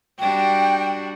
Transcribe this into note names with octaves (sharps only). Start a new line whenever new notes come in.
G3 D4 F#4 G5